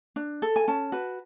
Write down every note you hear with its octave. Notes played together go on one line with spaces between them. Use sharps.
D4
A4
G#5
C#4 A5
F#4 B4